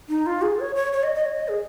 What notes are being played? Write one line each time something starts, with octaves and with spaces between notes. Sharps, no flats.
D#4
F4
G#4
C#5
C#5
C#5
D#5
D#5
C#5
D#5
G#4